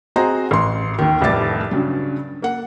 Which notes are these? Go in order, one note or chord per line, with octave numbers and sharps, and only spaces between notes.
C4 F#4 G#4 C5 D#5 A#5
A1 C6
D#2 D#3
F1 C2 A2 D6 A6
G2 C#3 F#3
A#3 F#5